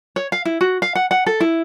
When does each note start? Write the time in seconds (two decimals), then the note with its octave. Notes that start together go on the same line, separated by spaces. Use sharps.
0.16 C#5
0.32 F5
0.45 E4
0.61 F#4
0.82 F5
0.95 F#5
1.11 F#5
1.26 A4
1.40 E4